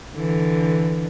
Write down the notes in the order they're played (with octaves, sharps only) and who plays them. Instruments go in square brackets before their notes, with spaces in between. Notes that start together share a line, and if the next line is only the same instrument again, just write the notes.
[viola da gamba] D3 E3